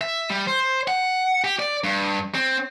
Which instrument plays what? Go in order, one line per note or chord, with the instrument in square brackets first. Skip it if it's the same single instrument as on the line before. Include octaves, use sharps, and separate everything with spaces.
[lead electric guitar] E5
G3
C5
F#5
G4
D5
G2
C4